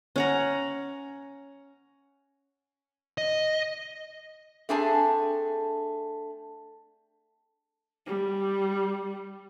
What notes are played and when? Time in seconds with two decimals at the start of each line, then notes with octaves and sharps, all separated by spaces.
0.16 C#4 F#5 A#5
3.18 D#5
4.69 A3 C4 D4 G#4 G#5 A5
8.06 G3